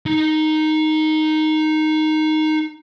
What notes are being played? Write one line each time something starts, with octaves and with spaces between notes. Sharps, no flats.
D#4 A#5